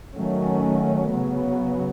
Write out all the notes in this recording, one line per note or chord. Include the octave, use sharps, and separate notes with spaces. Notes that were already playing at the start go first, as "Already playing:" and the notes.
D#3 F#3 A3 C#4
C#3 F#3 B3